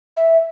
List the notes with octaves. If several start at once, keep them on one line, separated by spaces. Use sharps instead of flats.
E5